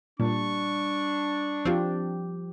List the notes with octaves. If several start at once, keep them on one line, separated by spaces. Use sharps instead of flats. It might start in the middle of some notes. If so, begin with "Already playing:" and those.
A#2 G3 D4 C#6
F3 C4 F4 G4